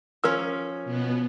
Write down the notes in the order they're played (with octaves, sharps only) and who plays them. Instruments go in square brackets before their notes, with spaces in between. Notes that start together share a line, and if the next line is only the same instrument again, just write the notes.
[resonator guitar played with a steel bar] F3 C#4 [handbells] A#4 E6
[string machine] B2 B3